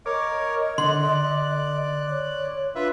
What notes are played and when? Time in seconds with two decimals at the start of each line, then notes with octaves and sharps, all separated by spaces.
0.06 A#4 C#5 D#5 D6
0.78 D3 D5 C6 F#6
2.10 C#5
2.75 D4 F4 B4 E5